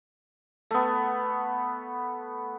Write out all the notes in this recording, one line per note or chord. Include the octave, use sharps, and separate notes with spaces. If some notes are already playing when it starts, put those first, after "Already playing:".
A3 B3